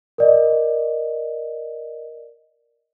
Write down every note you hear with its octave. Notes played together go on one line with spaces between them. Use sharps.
A#4 D5 D#5